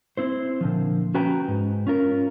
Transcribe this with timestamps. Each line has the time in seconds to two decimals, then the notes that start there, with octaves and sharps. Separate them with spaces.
0.17 C4 E4 C5
0.61 A#2 D3 F3
1.14 C#4 F#4 B4 G5 G#5 A#5
1.48 G#2
1.87 C#4 F4 A#4